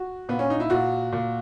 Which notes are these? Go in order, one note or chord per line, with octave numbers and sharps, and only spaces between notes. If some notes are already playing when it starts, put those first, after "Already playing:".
Already playing: F#4
A#2 B3
C#4
D#4
E4
A#2 F#4
A#2